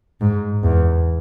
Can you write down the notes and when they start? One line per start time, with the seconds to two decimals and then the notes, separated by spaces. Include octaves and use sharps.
0.21 G#2
0.63 E2